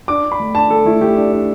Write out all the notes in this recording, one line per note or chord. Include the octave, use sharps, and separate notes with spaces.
D4 D6
D4
B5
A3
D4 A5
A3 A4
A3 E4
A3 G4
D4
D4